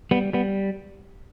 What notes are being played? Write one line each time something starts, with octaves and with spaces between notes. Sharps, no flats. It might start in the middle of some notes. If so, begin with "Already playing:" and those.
G3 B3
G3 B3